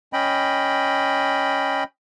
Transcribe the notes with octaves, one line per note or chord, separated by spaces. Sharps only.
C#4 D#5 G5 B5